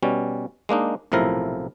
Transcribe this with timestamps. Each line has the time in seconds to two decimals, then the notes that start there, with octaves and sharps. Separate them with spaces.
0.03 B2 G3 C#4
0.69 G#3 A#3 D4 D#4
1.12 B1 A2 C3 F3 E4 A#4